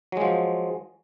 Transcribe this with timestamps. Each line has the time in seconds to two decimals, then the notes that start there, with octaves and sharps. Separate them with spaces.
0.12 F#3
0.17 G#3
0.21 F3